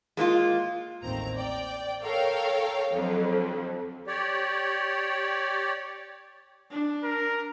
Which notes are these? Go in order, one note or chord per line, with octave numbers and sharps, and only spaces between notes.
G#3 A#3 D4 F4
A1 D#2 C4 A#5
D5 G5
A4 A#4 C#5 F5 G5
F2 D3 F#3
G4 C#5 D5
D4
A#4